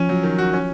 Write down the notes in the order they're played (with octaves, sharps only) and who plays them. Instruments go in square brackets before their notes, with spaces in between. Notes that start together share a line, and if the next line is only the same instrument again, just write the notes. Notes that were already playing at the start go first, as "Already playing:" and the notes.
Already playing: [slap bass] F3 [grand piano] C#4
[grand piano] F#3
D#3
F#4
C#4